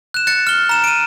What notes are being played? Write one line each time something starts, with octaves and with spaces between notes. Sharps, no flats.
F#6 E7
F#6 A6 C#7
F6 G7
A#5 E7
D7 D#7